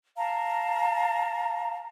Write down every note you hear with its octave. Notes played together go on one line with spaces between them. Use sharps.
F5 A5 A#5